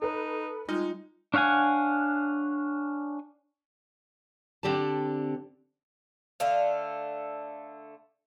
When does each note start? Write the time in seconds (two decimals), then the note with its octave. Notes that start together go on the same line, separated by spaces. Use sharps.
0.02 D#4 A4 B4
0.69 G3 G#3 D#4 F4 D#5
1.34 D4 C#5 F5 F#5 G#5
4.63 D3 C4 G4 D5 A5
6.40 D3 A3 F5